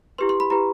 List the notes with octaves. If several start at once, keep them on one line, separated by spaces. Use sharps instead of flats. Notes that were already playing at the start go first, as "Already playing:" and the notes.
E4 G4 B4 C6
C6
B5
E4 G4 B4 A#5